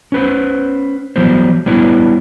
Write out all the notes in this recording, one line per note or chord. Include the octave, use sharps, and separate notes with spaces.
C#4 B4 C5
E3 F#3 G3 B3 C5
G3 B3 D4 E4 B4 C#5